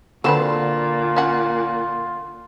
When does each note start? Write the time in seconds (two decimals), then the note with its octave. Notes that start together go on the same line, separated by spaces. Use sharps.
0.24 A#2 D3 F#3 C4 F4 B4 A5
1.16 C#4 F#4